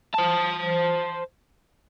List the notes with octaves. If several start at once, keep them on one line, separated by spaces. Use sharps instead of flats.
C5 A5